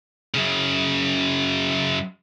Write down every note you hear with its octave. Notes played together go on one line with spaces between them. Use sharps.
F#2 C#3